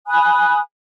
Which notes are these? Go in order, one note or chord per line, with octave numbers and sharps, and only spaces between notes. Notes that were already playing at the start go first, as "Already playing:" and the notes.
G#5 B5 D#6 F#6